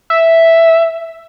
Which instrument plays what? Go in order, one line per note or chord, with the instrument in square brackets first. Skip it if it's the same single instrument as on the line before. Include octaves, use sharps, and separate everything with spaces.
[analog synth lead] E5